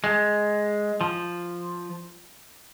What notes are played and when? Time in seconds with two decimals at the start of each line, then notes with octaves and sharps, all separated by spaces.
0.04 G#3
1.01 F3